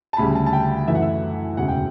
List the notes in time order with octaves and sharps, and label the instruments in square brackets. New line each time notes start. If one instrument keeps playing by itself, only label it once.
[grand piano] A5
D2 C#3 G3 B5
A5
A5
G5
F#2 E3 A3 E5
F#5
E5
E1 D2 C#3 F#5
G5